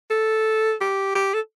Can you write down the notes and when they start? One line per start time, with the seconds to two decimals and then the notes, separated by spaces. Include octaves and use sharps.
0.10 A4
0.81 G4
1.15 G4
1.34 A4